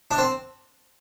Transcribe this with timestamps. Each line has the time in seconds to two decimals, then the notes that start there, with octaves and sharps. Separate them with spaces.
0.11 D4
0.18 C4